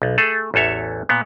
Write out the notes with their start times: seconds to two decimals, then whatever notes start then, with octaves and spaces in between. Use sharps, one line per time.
0.02 B1
0.18 A3 G#4 A4
0.54 A1 E2 A4 C#5 E5
1.09 A#2 B3